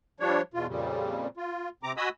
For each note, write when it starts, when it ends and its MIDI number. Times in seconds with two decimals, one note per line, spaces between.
0.20 0.41 53
0.20 0.41 55
0.20 0.41 62
0.20 0.41 73
0.54 0.67 40
0.54 0.67 47
0.54 0.67 65
0.68 1.28 41
0.68 1.28 46
0.68 1.28 49
0.68 1.28 55
1.37 1.69 65
1.83 1.92 48
1.83 1.92 60
1.83 1.92 82
1.83 1.92 86
1.97 2.09 66
1.97 2.09 75
1.97 2.09 80
1.97 2.09 83
1.97 2.09 87
1.97 2.09 88